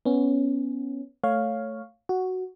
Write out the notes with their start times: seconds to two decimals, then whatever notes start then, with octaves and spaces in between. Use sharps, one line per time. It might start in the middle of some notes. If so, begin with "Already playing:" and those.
0.05 B3 C#4
1.23 A3 C#5 F5
2.09 F#4